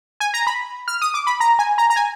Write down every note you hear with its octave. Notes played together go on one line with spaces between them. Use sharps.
G#5
A#5
B5
F6
D#6
D6
B5
A#5
G#5
A#5
A#5
G#5